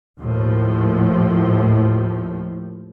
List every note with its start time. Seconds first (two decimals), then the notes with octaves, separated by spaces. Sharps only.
0.19 D#2 A2 F3